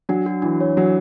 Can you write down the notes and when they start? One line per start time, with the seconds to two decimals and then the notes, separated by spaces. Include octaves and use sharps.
0.09 F#3 D4
0.26 F#4
0.42 E3 D4
0.60 C#5
0.77 F#3 D4